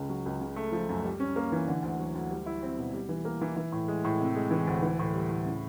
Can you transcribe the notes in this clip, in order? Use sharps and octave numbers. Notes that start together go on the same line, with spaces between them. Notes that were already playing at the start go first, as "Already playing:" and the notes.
Already playing: C#2 C#3
F#3
C#2
C#3
A3
F3
F#2
G3
C#4
A#3
E3
D3
D2
F#3
D2
G3
E4
C4
B2
G3
E3
A#3
E3
E3
A2
G#3
A2
C3
G#3
E3
D2
E3
A2
G3
A2
C#3